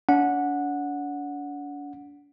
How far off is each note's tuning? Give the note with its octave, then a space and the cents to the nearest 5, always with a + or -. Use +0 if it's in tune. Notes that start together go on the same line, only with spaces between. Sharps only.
D4 -40 F#5 -15